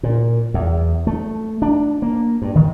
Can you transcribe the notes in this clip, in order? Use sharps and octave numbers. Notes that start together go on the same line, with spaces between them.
A#2
E2
A3
D4
A#3
G2
D#3